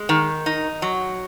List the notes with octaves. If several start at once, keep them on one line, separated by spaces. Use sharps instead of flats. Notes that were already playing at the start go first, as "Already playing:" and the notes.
Already playing: G#3
D#3
D#4
F#3